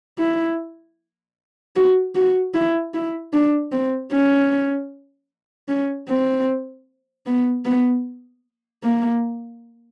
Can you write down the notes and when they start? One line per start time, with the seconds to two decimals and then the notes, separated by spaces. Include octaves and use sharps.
0.18 E4
1.76 F#4
2.15 F#4
2.54 E4
2.94 E4
3.33 D4
3.72 C4
4.12 C#4
5.69 C#4
6.08 C4
7.26 B3
7.65 B3
8.83 A#3